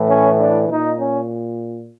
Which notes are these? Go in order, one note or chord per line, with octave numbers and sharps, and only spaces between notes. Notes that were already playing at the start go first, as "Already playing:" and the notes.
Already playing: A2 E3
C#4
D4
A#2 D#4
C#4